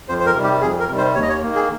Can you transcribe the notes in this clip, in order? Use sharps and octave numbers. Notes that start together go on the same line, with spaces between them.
F2 C5
C5
A#4
C3 D#3 G3
G4
F2 G#4
A#4
C3 D#3 G3
C5
D#2 C#5
D#5
C#5
D#3 A#3
G#4